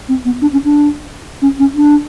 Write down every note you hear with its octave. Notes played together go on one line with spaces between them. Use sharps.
C4
B3
D4
C#4
D4
C#4
C#4
D4